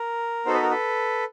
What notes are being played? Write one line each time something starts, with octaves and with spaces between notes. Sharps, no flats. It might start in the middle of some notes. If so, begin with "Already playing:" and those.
Already playing: A#4
B3 D#4 F#4 A4 C5
B4
A#4
A4 B4